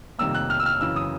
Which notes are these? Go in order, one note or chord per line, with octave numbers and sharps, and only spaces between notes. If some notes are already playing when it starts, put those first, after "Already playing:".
F2 C3 D#3 G3 A#3 E6
F#6
F6
E6
F6
F#2 C#3 E3 E6
D#6